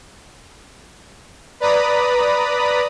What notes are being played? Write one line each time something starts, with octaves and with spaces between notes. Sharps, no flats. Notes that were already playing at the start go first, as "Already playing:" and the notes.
B4 D5 A#5 B5 D#6